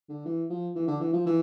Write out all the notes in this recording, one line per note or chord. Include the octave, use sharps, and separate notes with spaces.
D3
E3
F3
E3
D3
E3
F3
E3